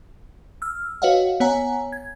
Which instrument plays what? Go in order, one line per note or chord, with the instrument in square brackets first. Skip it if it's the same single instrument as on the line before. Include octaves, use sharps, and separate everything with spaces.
[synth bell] E6 F6
F#4 B4 C#5 D#5 F5 F#5
B3 C#5 F#5 G#5 A#5
G#6